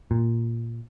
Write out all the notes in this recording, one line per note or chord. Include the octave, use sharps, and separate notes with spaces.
A#2